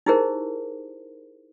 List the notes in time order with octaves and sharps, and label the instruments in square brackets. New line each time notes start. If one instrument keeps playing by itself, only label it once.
[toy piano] D#4 E4 G4 G#4 A#4 C5